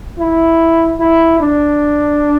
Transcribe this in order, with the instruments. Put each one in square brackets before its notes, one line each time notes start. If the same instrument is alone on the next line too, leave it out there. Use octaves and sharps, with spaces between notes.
[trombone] E4
E4
D4